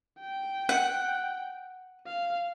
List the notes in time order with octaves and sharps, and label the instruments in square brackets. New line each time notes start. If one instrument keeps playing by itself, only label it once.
[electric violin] G5
[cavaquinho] F#5
[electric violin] F5